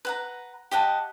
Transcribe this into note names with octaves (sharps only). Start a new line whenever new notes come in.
B4 F#5 A#5
G4 D#5 F#5 A5